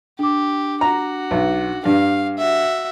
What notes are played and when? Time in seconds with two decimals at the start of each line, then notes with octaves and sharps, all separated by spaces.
0.19 D4 G4 D6
0.81 F#4 A#5
1.31 B1
1.85 G2 F5
2.38 F#4 E5